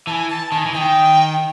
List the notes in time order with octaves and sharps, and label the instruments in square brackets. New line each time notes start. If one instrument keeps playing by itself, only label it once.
[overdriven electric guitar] E3 [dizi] A5
[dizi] G#5
A5
[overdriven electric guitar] D#3 [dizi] A5
[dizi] G#5
[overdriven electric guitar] E3
[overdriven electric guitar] D#3 [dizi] G5 G#5